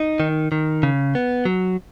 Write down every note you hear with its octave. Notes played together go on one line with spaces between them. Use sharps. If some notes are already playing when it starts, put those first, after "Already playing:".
Already playing: D#4
D#3
D#3
C#3
B3
F#3